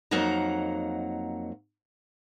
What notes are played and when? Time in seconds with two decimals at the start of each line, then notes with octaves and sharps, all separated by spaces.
0.11 F2 F#3 A#3 D#4 F#5 A#5